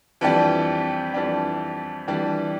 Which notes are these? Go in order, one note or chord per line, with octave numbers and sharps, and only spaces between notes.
F2 E3 G3 D4 G4
F2 E3 G3 D4 G4
F2 E3 G3 D4 G4